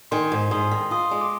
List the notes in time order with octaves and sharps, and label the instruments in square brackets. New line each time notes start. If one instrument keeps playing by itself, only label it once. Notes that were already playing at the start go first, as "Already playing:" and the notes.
[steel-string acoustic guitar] D#3 [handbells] G#5 C6
[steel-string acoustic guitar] G#2
[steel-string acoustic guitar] G#2 [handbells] C6 D#6
[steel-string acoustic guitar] D#3
[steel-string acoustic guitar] F4 [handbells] C6 D#6
[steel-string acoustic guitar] G#3
[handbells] D6